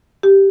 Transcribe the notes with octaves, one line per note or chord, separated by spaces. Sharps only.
G4